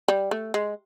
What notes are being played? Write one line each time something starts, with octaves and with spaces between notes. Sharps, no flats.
G3
A3
G#3